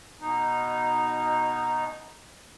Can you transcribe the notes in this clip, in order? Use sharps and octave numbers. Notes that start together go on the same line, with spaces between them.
B2 D#4